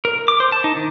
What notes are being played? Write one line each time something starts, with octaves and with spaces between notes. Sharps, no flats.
A#4
D6
C5
A5
D#4
D#3